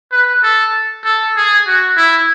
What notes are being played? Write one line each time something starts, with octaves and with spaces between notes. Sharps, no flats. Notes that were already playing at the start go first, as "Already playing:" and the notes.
B4
A4
A4
G#4
F#4
E4